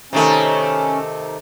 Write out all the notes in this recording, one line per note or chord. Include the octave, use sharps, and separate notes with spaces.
C3 D#3 A3 C#4